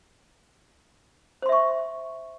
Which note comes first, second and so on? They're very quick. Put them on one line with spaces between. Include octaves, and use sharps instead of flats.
C5 C6 E5 C#6